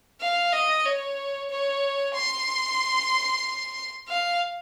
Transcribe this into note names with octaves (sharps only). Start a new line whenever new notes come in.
F5
D#5
C#5
C#5
C6
F5